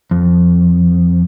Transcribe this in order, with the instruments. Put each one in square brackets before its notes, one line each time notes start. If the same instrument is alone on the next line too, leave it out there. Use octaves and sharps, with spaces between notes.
[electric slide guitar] F2